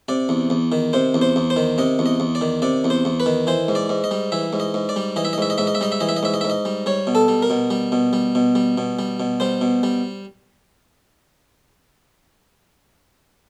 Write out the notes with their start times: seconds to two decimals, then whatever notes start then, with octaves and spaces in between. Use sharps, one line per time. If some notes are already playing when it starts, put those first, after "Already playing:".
0.09 C3 D5
0.29 E2
0.50 E2
0.72 D#3
0.93 C3 C5
1.14 E2
1.22 C5
1.36 E2
1.50 C5
1.56 D#3
1.78 C3 D#5
1.99 E2
2.06 D#5
2.20 E2
2.35 D5
2.41 D#3
2.62 C3 D5
2.84 E2
2.90 C5
3.05 E2
3.20 B4
3.26 D#3
3.47 E3 C5
3.68 G#2
3.75 D5
3.89 G#2
4.04 D#5
4.11 G3
4.32 E3 E5
4.53 G#2
4.60 D#5
4.74 G#2
4.89 D5
4.96 G3
5.16 E3 D#5
5.25 E5
5.33 D#5
5.38 G#2 E5
5.50 D#5
5.58 G#2 E5
5.67 D#5
5.75 E5
5.81 G3 D#5
5.92 E5
6.00 E3 D#5
6.09 E5
6.17 D#5
6.23 G#2 E5
6.34 D#5
6.41 E5
6.45 G#2
6.50 D#5
6.65 G3
6.86 G3 C#5
7.07 B2
7.15 A4
7.28 G3
7.43 A#4
7.50 B2
7.70 G3
7.92 B2
8.13 G3
8.35 B2
8.55 G3
8.78 B2
8.99 G3
9.20 B2
9.40 G3 C5
9.61 B2
9.83 G3